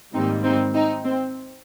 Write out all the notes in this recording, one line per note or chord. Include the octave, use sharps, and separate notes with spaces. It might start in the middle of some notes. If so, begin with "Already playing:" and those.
G#2 D#3 G3 A#3 C4 D#4
C4 D#4
C4 D#4
C4